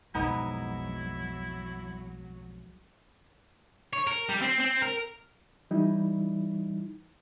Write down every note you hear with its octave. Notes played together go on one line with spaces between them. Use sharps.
B1 F2 G#2 F#3 B3 D#4 E4
C#5
A#4
G3
C4
C4
A#4
E3 G3 D#4 E4